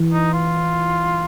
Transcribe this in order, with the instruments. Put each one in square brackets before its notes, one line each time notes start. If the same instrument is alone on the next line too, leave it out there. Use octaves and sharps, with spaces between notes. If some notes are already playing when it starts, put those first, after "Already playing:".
Already playing: [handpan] E3
[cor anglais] D#4
F4